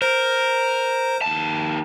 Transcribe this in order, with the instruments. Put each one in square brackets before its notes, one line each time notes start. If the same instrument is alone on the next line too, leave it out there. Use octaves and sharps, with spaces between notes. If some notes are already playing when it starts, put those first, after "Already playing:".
[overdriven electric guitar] A#4 [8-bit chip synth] C5
[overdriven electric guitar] D#2 A5